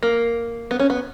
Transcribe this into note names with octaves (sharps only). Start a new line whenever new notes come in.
A#3
B3
C#4
B3